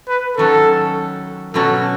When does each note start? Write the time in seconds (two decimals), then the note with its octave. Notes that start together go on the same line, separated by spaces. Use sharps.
0.08 B4
0.37 D#3 F#3 C#4 A4
1.54 B2 F#3 C#4 F#4 A4